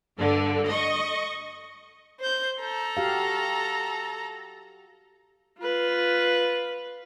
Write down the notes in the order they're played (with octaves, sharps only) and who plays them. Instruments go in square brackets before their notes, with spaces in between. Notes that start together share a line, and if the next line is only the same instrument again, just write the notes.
[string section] G2 D3
D#5 C#6
[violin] C5 G6
A4 A#5
[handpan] F#4 G4 F5
[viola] F4 B4